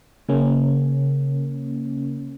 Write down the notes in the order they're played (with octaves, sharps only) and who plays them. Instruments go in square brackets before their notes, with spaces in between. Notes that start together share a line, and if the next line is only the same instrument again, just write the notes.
[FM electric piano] C#3 A#3 C#4